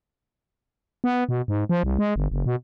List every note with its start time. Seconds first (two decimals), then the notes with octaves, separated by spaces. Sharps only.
1.04 B3
1.29 B2
1.48 G#2
1.69 F3
1.83 C2
1.99 G#3
2.16 G1
2.32 F#1
2.46 B2